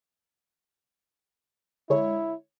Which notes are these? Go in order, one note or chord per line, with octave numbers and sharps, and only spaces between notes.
D3 G#3 E4 C#5